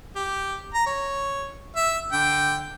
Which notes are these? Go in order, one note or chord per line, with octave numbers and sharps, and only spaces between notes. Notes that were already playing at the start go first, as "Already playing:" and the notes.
G4
A#5
C#5
E5
D3 G5